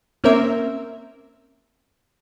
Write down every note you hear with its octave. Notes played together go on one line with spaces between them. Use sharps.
A#3 C4 C#4 A#4 E5